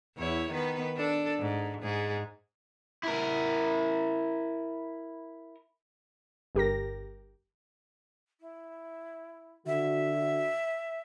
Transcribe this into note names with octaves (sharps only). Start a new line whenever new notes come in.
E2 E4 C#5
D#3 B3 B4
D4 A4
G#2
G#2 G#4
E4 A#4
G1 G4 A#4 A#6
E4
D3 F#4 E5